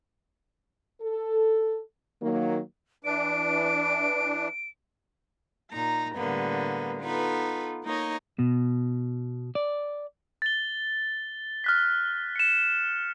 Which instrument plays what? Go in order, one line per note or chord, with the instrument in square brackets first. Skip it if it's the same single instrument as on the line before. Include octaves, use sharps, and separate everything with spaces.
[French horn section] A4
D#3 F#3 A#3
[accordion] E3 D4 [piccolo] D7
[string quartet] A#2 D#4 A#5
A2 D3 G3 A#3 B3
B3 D#4 F4 A4 B4
A#3 D#4 C#5 D#5
[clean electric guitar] B2
D5
[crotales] A6 G7
F6 F#6 B6
C#7 E7